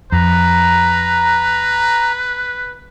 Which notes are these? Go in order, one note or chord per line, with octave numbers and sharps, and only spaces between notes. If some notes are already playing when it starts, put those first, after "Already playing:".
F2 B4 A#5